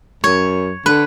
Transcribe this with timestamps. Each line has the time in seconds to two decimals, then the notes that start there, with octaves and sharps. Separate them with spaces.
0.24 F#2 C#5
0.86 D3 B4